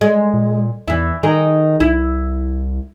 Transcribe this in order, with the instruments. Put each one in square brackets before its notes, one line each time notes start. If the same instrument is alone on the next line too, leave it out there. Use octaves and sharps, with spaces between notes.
[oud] G#3
[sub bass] A#2
[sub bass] E2 [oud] E3 E4
[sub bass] D#3 [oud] D#4 G#4 A#4
[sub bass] C2 [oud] E4